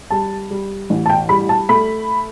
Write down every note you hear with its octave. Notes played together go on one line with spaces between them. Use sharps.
G3 A5
G3
A1
A5
G5
G3 B5
A5
A3 B5